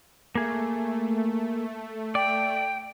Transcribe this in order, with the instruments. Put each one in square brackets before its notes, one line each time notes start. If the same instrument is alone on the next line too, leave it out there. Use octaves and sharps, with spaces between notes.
[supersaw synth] A3 [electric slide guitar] A#3 G#4
[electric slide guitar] D5 [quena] G5